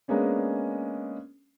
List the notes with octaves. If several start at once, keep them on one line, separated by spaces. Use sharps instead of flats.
G#3 A#3 B3 C#4 D4